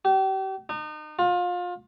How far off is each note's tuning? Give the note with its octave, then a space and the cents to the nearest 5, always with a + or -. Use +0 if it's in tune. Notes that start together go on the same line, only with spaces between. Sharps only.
G4 -35
D#4 -35
F4 +30